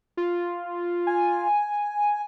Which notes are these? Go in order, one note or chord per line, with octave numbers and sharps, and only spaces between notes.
F4
G#5